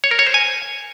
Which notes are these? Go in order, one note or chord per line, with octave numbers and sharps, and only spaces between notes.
C#5
A#4
C#5
C5
G#5